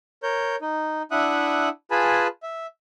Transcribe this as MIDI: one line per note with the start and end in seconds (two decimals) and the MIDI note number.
0.23 0.56 70
0.23 0.56 73
0.23 0.56 91
0.61 1.02 63
1.11 1.69 62
1.11 1.69 64
1.11 1.69 76
1.11 1.69 78
1.11 1.69 87
1.11 1.69 90
1.91 2.27 65
1.91 2.27 68
1.91 2.27 71
1.91 2.27 80
1.91 2.27 81
1.91 2.27 83
2.43 2.67 76